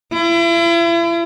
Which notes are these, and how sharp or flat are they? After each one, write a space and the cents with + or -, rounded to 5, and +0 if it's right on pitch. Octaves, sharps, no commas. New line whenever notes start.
E4 +40